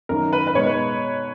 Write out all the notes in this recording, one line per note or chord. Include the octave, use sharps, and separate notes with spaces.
F#2 D#3 A#3 A#4
B4
B4
B2 G#3 D#4 C#5
B4